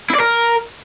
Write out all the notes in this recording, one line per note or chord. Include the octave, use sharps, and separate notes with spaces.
E4
D5
A#4